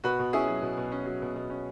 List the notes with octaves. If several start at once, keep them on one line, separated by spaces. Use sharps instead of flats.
B2 F#4 B4
B2
C#4 E4 G#4
F#3
B2
B2
C#4
F#3
B2
B2
C#4